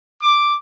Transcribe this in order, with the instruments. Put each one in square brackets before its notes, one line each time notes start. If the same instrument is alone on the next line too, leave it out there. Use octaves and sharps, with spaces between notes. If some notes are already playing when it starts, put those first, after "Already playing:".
[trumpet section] D6